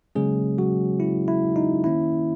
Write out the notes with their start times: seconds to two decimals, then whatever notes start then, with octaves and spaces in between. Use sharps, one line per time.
0.15 C#3 F#3 G#3 A#3 C#4 G#4
0.58 F#3 F#4
1.00 E4
1.28 E4
1.56 D#4
1.84 D#3 A#3 C#4 E4